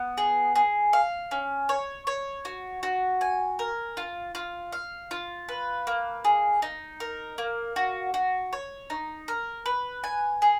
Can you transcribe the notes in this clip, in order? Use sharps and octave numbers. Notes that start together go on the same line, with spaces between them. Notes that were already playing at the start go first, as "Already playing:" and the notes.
Already playing: B3
G#4
G#4
F5
C#4
C#5
C#5
F#4
F#4
G#5
A#4
F4
F4
F5
F4
B4
A#3
G#4
D#4
A#4
A#3
F#4
F#4
C#5
D#4
A#4
B4
G#5
G#4